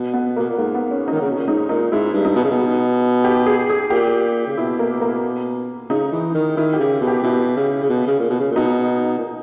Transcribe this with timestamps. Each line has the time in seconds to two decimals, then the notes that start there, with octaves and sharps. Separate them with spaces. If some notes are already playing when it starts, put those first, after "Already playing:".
Already playing: B2
0.14 B3
0.36 B2 A#3
0.49 A#2
0.58 G#2 A#3
0.74 B3
0.91 C#4
1.08 D#3 D#4
1.21 C#3
1.26 B2 C#4
1.38 A#2
1.47 G#2 D#4
1.69 A#2 D#4
1.92 G#2 E4
2.13 G2
2.25 D#4
2.36 B2
2.44 C#3
2.51 B2
3.24 G4
3.46 G#4
3.69 G#4
3.90 A#2 G4
4.47 C#3
4.57 B2 E4
4.79 A#3
5.01 A#3
5.90 C#3 D#4
6.12 E3
6.34 D#3
6.57 D#3 E4
6.74 G4
6.79 C#3
7.01 B2
7.07 G4
7.23 B2 E4
7.56 C#3
7.83 C#3
7.89 B2
8.07 C#3
8.19 A#2
8.30 B2
8.40 C#3
8.51 A#2
8.56 B2 D#4
9.18 A#2